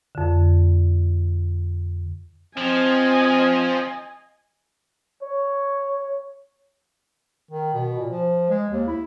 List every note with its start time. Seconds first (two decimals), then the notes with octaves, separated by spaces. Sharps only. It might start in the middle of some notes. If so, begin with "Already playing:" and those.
0.15 F2 D3
2.58 F3 C4 D#5 G#5
5.23 C#5
7.51 D#3
7.74 B2
7.99 A#2
8.10 F3
8.50 G#3
8.70 D#2
8.87 E4